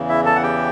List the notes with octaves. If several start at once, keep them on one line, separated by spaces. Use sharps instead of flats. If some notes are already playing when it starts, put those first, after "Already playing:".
Already playing: E2 C#3 E3
E4 E5
A4 A5
F#5
G4 G5